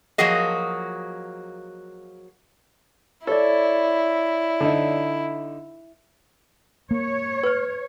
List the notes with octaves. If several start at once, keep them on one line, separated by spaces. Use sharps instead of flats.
F3 F#3 A#3 F#4 G#4 D#5
E4 A4 C#5 D5
D3 D#4
A#3 C#5
B4 F6